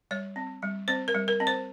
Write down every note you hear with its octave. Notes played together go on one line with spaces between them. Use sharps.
G3 C#5
C4
G3
C4 C5
A#4
G3
A#4
C4
C5